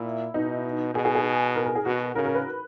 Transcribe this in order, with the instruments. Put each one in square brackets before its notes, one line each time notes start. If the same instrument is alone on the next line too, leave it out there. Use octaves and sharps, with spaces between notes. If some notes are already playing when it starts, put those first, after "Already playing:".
Already playing: [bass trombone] A#2 [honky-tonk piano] E4
[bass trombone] B2 [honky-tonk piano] D#4
[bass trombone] B2 [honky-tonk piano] G#4
[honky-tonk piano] G#4
G#4
A#4
A#4
G#4
[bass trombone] B2 [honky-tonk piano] F#4
[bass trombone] C#3 [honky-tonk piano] A#4
[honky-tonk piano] A#4
B4